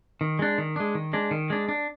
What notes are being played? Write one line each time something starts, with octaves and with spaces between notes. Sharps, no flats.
D#3
G#3 D4
D#3
G#3 D4
D#3
G#3 D4
D#3
G#3 D4
D4